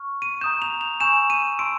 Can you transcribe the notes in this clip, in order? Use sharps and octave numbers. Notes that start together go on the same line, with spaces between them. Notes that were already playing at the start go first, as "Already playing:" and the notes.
Already playing: C#6 F6
D#7
A#5 D#6 G6 E7
F7
F7
G#5 C#6 E6 G6 E7
D#7
A5 C6 E6 D7